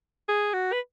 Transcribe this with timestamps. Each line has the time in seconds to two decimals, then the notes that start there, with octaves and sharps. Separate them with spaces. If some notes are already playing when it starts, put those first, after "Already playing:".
0.29 G#4
0.54 F#4
0.72 B4